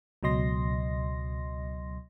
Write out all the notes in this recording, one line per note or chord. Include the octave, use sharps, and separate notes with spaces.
C#2 B2 F#3 D#5 C6 A#6